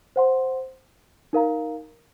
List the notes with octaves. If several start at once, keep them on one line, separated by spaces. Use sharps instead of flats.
C5 F#5 C6
D#4 A#4 F5 A#5